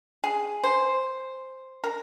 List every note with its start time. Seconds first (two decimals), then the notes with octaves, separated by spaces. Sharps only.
0.24 G#4
0.64 C5
1.84 A#4